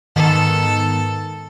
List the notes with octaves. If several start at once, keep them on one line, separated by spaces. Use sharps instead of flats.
G#2 D#3 B3 A4